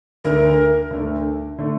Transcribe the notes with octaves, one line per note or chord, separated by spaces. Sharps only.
D2 D3 A3 A#4
D2 D3 A3
D3 A3